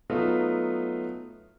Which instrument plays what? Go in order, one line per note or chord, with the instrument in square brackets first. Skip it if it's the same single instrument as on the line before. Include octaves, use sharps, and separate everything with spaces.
[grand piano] F#3 A3 B3 D#4 F4